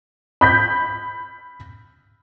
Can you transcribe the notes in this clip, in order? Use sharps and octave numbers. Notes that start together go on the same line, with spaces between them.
B5 G6 B6